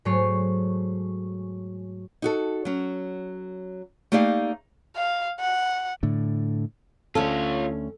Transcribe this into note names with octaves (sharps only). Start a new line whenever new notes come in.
G#2 F#3 A3 C#5 C7
D#4 F#4 A4
F#3 C#4
A3 A#3 D#4 G4 D5 F5
F5
F#5
A2 D3
D2 C#4 F4 A4 C#5